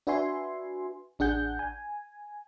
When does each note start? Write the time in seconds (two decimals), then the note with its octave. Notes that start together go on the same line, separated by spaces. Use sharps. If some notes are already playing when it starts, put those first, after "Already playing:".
0.07 D4 F#4 B4 E5 G#5 C6
1.19 A1 D4 G#4 F#5 G6
1.59 G#5